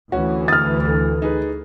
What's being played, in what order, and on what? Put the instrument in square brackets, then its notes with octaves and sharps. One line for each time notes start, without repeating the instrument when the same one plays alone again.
[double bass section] D2 E3 [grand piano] C#4 F#4
[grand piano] D#6 [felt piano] F6 A6
[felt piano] A4
[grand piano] D#4 G#4 B4